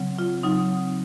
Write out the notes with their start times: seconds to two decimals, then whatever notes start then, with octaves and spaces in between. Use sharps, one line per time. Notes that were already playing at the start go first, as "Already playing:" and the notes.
Already playing: C#3 F#3 C4
0.19 F4
0.43 C#3 F#3 C4 D#4